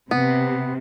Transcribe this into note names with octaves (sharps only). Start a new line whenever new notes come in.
C3 B3